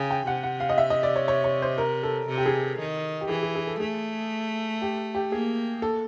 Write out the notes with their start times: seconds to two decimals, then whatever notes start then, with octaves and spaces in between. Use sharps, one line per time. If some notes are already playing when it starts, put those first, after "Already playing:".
Already playing: C#3 G5 G#5
0.11 G5
0.27 C3 F#5
0.43 F#5
0.60 F5
0.69 D#5
0.78 E5
0.90 D#5
1.03 D5
1.16 C#5
1.28 C#5
1.44 C#5
1.62 C5
1.78 A#4
2.03 A4
2.29 C3
2.38 G4
2.46 G#4
2.80 D#3
3.21 G4
3.29 E3 G#4
3.43 G#4
3.55 G#4
3.67 A4
3.80 A3 G#4
4.82 G4
5.15 G4
5.32 A#3 G#4
5.82 A4